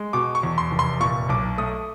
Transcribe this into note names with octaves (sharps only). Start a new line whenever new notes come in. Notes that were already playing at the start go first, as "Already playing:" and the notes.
Already playing: G#3
B2 D6
C#6
E2
C6
F1
C6
A#2 C#6
B1 D6
A3 D#6